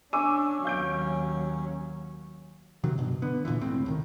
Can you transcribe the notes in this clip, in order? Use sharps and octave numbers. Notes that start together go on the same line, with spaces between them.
C#4 D4 G#5 C#6 D6 E6
D#2 F#3 F5 G6 D7
C3 D#3 F#3
G2 B2
D3 B3
F#1 A#2 D3 E3
G1 C#2 A2 C4
C2 D#3